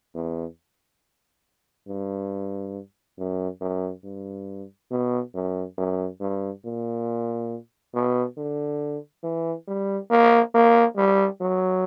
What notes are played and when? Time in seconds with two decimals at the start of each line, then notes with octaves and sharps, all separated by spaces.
0.15 E2
1.88 G2
3.18 F#2
3.61 F#2
4.04 G2
4.91 B2
5.34 F#2
5.78 F#2
6.20 G2
6.65 A#2
7.94 B2
8.37 D3
9.23 E3
9.67 G3
10.10 A#3
10.54 A#3
10.97 G3
11.41 F#3